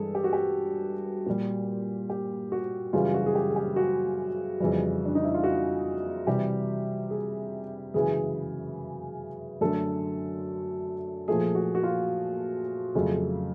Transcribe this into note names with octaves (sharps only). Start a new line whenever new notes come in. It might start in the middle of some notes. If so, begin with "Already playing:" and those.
Already playing: G2 E3 G#3 G#4 A4
G4
F#4
G4
A#2 G3
G4
F#4
F#2 C#3 E3 G3 F4
F#4
G#4
G4
G#4
G4
F#4
F2 C#3 E3 G3
D4
D#4
E4
F4
F#4
C3 E3 G3 G4
G#4
F#2 C#3 E3 G#3 G#4
F#2 D3 F#3 A3 A4
A#2 F3 A3 G#4
F#4
F#4
F4
F2 C#3 F#3 A3